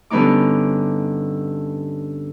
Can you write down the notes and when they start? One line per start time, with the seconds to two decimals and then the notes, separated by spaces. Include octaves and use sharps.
0.10 G2 D3 B3 C#4 D#4 D6